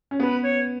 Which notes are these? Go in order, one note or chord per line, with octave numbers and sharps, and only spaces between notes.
C#4
B3 B4
C#5